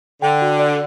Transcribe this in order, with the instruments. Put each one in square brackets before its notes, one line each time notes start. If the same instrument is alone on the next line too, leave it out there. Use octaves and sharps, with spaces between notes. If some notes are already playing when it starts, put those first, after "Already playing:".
[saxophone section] D3 [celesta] G5
[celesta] F#4
D5